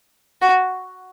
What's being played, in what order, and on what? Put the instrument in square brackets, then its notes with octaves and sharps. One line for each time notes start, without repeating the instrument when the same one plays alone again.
[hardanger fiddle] F#4